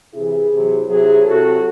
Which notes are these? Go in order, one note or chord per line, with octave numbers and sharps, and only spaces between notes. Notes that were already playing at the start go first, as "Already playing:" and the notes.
C3 E3 E4 G#4
C3 F#3
C3 F#3 E4 G#4
C3 F#3 F#4 A4